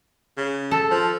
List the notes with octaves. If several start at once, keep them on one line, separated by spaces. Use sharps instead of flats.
C#3
A4
F3